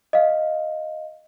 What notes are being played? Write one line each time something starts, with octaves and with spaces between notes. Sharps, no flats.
D#5 F5